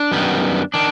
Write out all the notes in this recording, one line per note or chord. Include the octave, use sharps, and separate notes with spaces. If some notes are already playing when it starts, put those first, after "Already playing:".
Already playing: D4
F#2 D#3 G3 B3
D#3 D4